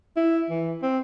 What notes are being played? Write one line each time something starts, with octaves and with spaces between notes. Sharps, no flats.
E4
E3
C4